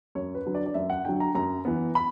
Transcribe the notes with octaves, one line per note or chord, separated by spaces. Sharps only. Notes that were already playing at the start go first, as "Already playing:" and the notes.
F#2 C#5
B4
D3 F#3
D5
D5
F#2 E5
F#5
D3 F#3 G5
A#5
F#2 A#5
E3 B3
B5